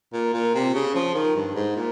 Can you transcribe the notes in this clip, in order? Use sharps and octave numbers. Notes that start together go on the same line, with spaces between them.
A#2
A#2
C3
C#3
F3
D#3
G2
G#2
A#2